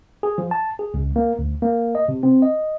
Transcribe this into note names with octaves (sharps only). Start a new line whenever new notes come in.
G#4
F3
A5
G#4
C#2
A#3
D2
A#3
D#5
C3
C4
D#5